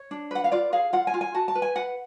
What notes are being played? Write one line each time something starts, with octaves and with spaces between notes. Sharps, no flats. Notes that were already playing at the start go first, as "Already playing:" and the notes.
Already playing: C#5
D4
B4 F#5
F5
F4 D5
G#4 F5
F4 F#5
G#5
F4
G#5
F#4 A5
A5
B4
G#5
B4 F#5